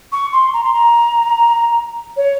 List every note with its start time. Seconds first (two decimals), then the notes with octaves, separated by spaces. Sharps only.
0.12 C#6
0.32 C6
0.53 A#5
0.63 C6
0.73 A#5
2.16 C#5